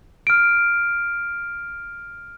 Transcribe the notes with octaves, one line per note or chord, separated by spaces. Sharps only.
F6 D7